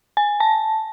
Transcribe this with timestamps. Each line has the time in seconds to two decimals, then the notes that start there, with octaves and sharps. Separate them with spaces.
0.17 G#5
0.40 A5